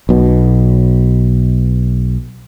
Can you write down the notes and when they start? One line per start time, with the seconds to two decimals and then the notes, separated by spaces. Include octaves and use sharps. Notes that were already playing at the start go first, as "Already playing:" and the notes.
0.09 B1 B2